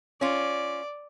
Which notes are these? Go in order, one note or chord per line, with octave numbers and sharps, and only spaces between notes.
C#4 F4 D5